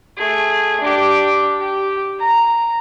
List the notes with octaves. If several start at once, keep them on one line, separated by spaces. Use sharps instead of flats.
A3 G#4
D4 G4
G4
A#5